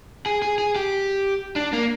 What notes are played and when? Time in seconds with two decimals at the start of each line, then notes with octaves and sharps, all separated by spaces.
0.26 G#4
0.42 G#4
0.58 G#4
0.76 G4
1.56 D4
1.73 A#3